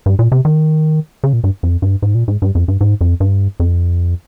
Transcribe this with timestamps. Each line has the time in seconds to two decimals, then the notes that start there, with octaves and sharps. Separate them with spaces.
0.06 G2
0.19 A#2
0.32 C3
0.45 D#3
1.24 C#3
1.33 A#2
1.44 G2
1.63 F2
1.82 G2
2.02 G#2
2.15 A#2
2.28 G#2
2.42 G2
2.55 F2
2.68 G2
2.81 G#2
3.01 F2
3.20 G2
3.60 F2